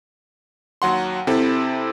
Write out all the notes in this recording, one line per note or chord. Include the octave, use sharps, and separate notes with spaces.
D#2 F#3 F#5 C6
C3 C4 E4 A4